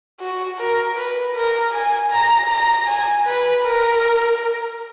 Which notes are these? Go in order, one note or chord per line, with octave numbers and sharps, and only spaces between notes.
F#4
A#4
B4
A#4
G#5
A#5
A#5
G#5
B4
A#4